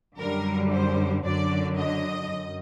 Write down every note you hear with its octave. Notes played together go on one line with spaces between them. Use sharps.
F#2 D3 G3 A#4
C5
F#2 D3 F#3 D5
D#5
F#2